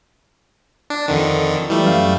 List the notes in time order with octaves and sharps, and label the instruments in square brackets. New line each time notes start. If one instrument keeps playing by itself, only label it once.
[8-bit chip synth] D4
F2 D3 D#3
[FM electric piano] E3 [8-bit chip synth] G3 A3
[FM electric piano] F#2 F5